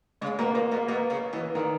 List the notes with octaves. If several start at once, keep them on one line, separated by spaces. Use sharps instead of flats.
C#3 G#3
B2 A#3
A#2 A#3
B2 A#3
B2 A#3
C#3
B2 E3
A#2 D#3